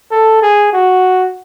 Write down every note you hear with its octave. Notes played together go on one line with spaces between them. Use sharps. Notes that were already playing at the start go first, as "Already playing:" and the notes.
A4
G#4
F#4